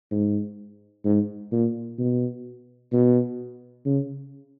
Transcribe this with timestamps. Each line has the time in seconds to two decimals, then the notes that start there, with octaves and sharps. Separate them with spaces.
0.11 G#2
1.05 G#2
1.52 A#2
1.99 B2
2.93 B2
3.86 C#3